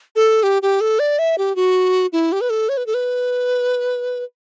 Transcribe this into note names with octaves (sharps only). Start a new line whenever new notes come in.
A4
G4
G4
A4
D5
E5
G4
F#4
E4
G4
B4
A4
C#5
B4
A4
B4